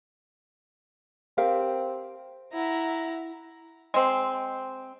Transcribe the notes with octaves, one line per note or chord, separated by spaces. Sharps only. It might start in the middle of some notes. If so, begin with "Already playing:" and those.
C4 G4 A#4 F5
E4 E5 F#5 A#5
G#3 C4